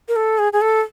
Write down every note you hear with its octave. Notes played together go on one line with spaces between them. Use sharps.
A#4
A4
G#4
G#4
A4